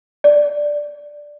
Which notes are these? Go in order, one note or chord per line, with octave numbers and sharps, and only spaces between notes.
D5